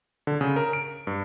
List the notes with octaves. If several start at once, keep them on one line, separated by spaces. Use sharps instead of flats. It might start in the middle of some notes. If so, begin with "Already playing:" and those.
D3
C#3
A#4
D7
G2